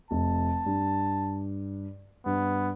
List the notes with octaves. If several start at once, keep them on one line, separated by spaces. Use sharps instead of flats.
F1 A5
G2
G2 B3